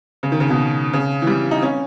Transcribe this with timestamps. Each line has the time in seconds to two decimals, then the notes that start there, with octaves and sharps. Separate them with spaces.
0.23 C#3
0.32 D#3
0.40 C#3
0.50 B2
0.93 C#3
1.22 E3
1.27 G3
1.51 D#4
1.62 C#4